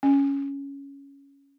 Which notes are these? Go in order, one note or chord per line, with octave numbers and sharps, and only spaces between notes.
C#4